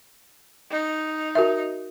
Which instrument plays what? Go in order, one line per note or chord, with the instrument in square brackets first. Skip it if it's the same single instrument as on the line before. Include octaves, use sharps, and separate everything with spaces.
[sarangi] D#4
[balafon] F#4 A#4 E5